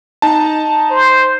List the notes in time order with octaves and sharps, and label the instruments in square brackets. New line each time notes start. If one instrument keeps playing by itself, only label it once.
[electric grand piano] D#4 A5
[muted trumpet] C5